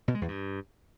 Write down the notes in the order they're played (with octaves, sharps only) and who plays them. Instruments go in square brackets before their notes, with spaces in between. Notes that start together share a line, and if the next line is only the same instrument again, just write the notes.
[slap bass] B2
G#3
E2
G2